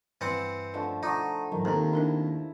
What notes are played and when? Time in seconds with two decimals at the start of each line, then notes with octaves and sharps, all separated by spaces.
0.21 G2 E3 C4 F#5
0.74 D3 F3 A3 D#5
1.03 D#4 F4 F#5 A5 C#6
1.52 G#2 D#3 E3 F#3
1.65 D#2 C4 D#4 A4 C5 D#5 A#5
1.93 D4 E4 A#4 D#5